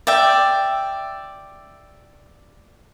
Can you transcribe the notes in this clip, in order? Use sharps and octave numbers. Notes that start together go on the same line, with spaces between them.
D5 E5 G5